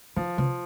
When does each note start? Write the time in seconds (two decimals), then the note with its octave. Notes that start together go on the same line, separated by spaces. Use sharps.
0.16 D#3 F3
0.38 C#3 F3